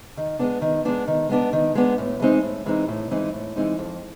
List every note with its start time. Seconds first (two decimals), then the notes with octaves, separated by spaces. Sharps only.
0.17 D#3
0.39 G#3 B3 D4
0.62 D#3
0.85 G#3 B3 D4
1.08 D#3
1.29 G#3 B3 D4
1.53 D#3
1.75 G#3 B3 D4
1.98 A2
2.20 E3 G#3 C4 D#4
2.43 A2
2.66 E3 G#3 C4 D#4
2.88 A2
3.11 E3 G#3 C4 D#4
3.34 A2
3.56 E3 G#3 C4 D#4
3.79 F2